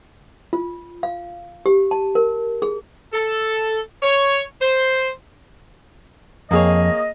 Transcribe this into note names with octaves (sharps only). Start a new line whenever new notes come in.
F4
F5
G4
A5
A#4
G#4
A4
C#5
C5
F2 A#3 G#4 C#5 D#5